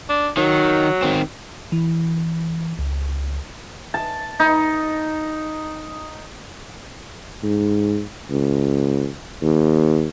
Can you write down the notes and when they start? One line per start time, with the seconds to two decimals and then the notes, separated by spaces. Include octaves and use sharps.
0.09 D4
0.37 D#3 F#3
1.03 D#3 C4
1.72 E3
2.79 C#2
3.94 A5
4.40 D#4
7.43 G#2
8.30 C#2
9.42 D#2